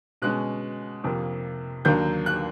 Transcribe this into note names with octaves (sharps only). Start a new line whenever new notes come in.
B2 G#3 C#4 F#6
F2 C3 F3 A#3
D#2 D3 F#3 A#3 G6
F#6